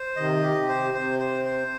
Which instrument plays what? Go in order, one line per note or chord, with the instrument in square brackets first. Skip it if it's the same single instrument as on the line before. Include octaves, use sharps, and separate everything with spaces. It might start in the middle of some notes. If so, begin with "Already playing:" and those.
Already playing: [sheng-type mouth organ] C5
[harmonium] C3 D#3 [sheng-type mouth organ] D#5
[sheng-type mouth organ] G4
[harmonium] C3
[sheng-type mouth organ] C5
[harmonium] C3 [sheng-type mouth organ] C5
[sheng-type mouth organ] C5
C5